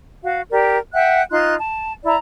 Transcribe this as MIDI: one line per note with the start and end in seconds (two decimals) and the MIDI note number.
0.24 0.42 66
0.24 0.42 77
0.50 0.77 67
0.50 0.77 70
0.50 0.77 74
0.93 1.21 76
0.93 1.21 78
0.93 1.21 79
0.93 1.21 90
1.31 1.55 63
1.31 1.55 65
1.31 1.55 84
1.31 1.55 90
1.59 1.92 81
2.04 2.15 64
2.04 2.15 74
2.04 2.15 82